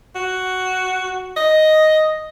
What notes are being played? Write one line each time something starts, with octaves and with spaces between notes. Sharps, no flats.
F#4
D#5